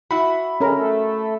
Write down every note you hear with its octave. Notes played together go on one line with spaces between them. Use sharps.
E4 F#4 B5
D3 G#3 C#4 A#4
A3 A4